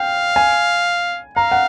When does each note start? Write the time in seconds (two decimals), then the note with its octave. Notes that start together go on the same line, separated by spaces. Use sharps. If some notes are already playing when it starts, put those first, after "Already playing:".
Already playing: F5 G5
0.36 G#5
1.37 F5 A#5
1.52 F#5